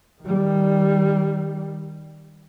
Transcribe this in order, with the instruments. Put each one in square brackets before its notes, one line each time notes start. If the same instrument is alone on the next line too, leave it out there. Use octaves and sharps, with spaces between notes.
[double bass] D#3 G3